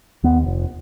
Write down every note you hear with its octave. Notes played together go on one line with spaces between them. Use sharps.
D#2 B3
F1